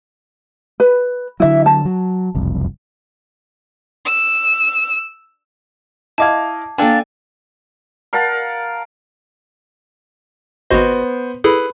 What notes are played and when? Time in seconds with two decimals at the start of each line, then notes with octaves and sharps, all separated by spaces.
0.80 B4
1.40 D3 F#3 E4 E5
1.66 A5
1.85 F#3
2.35 F#1 C2 F2
4.05 E6
6.18 E4 D#5 F5 A5 D6 G#6
6.78 A#3 D4 A4 F5 G5 G#5
8.13 A#4 F5 F#5 A5
10.70 G#1 B3 F#4 C5 D#5
11.44 E4 G#4 A4 B4